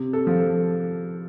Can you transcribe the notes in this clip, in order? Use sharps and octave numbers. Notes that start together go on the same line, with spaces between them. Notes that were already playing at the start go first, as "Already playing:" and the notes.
Already playing: C3
A4
F3
A4